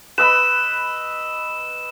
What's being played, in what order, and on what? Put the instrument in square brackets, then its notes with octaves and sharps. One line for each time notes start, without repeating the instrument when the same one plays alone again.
[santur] B4 D#5 B5 [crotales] E6 E7